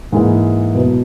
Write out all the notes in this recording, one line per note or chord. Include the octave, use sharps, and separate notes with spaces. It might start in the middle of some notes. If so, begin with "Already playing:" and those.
G#2 E3 A#3 E4 G#4
B2 F#3 B3